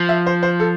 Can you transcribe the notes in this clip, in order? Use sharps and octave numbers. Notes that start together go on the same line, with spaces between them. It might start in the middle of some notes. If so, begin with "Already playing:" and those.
Already playing: F3
E5
C5
C5
A4